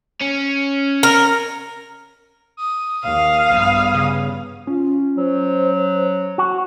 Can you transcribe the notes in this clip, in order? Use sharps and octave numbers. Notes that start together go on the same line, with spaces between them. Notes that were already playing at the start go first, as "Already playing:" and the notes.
C#4
A#4
D#6
D#2 F5
A#1 G2 B3
C#3
C#4 F4
F#3 C5
F#4